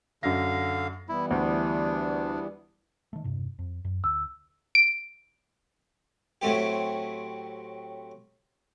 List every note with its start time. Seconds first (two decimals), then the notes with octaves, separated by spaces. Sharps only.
0.23 F#2 D3 F5 A#6
1.09 E3 G3 B3 E4
1.31 D2 D4
3.13 D#3 A3
3.24 E1 G2 C3
3.59 F2
3.85 F#2
4.04 D2 E6
4.75 D7
6.42 A2 F#3 A3 C4 G4